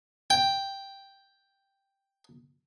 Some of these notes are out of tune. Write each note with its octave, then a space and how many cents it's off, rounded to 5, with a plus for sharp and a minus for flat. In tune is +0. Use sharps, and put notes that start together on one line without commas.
G5 +5